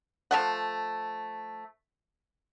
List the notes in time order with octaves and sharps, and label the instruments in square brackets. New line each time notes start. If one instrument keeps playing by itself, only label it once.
[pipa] F3 A3 F#5